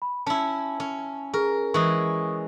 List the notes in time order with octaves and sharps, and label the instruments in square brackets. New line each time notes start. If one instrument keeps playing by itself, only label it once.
[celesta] B5
[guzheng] C#4 E4 [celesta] A5
[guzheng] C#4
[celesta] G#4 [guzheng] A#4
[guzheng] E3 G#3 [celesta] C#6 D#6